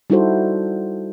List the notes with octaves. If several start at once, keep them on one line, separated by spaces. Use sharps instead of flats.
G3 D#4 E4 F#4 A4 C5